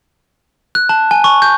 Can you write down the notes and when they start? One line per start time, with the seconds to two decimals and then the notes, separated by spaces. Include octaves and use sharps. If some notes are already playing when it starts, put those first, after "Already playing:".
0.75 F#6
0.89 A5
1.11 G#5
1.24 C#6
1.42 G6